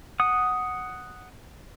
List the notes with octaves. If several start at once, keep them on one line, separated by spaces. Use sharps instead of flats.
F#5 D#6